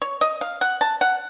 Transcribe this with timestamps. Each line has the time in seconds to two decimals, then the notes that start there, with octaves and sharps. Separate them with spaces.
0.02 C#5
0.21 D#5
0.41 F5
0.61 F#5
0.81 A5
1.01 F#5